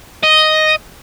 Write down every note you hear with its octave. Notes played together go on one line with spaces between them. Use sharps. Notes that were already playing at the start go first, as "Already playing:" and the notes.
D#5